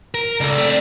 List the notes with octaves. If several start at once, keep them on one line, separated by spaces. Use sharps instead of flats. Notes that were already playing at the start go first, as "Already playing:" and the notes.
A#4
C#2 G3 D4 A4
A3 C4